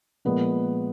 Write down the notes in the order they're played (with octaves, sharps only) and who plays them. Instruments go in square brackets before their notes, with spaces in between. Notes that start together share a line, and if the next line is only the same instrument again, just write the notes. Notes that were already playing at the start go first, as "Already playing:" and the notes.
[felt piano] A#2 F3 G#3 B3 B4